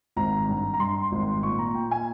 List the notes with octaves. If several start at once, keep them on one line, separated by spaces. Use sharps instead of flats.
G#1 A#5
G2
A#5
G2 C6
G#1
A#2 C#6
A#5
A#2 G5
G#5